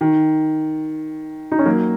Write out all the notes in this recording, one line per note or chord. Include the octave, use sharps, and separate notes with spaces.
D#3
D#4
C#4
F#3 A#3